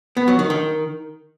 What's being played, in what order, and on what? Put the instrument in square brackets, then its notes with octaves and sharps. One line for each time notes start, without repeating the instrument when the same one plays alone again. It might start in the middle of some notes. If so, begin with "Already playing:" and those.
[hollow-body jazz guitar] B3
F#3
D#3
D#3